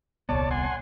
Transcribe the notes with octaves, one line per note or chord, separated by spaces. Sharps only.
D#1 C2 B3 C#5 D5 A5
F#5 G#5 C6